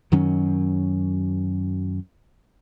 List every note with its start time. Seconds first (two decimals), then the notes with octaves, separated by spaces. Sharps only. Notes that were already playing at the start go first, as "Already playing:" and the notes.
0.12 F#2 D#3 F#3 C#4